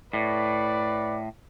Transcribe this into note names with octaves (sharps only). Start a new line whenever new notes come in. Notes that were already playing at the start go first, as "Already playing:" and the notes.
A2 B4 D5